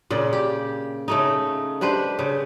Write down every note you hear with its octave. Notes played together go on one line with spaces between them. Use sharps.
A#2 C#3 D5
G4
C#3 A3 D#4
D4 G4 B4 C5
C#3